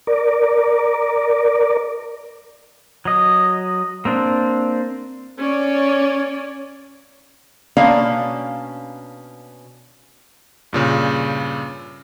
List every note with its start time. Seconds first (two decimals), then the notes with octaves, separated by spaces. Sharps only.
0.07 A#4 D5
3.05 F#3 D#5
4.05 A#3 C4 D4
5.38 C#4 C#5 D5
7.77 B2 A#3 C#4 D4 D5 F5
10.73 G2 A#2 C#3